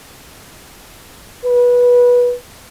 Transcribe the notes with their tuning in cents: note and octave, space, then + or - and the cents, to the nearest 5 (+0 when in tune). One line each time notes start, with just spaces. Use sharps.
B4 -20